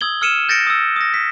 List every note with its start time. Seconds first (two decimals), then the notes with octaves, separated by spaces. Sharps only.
0.01 D#6 E6 G#6 F#7 G7
0.21 E6 F6 C#7 D#7 E7
0.49 G6 A6 A#6 C#7 D7
0.67 D#6 E6
0.96 D#6 A#6
1.14 B6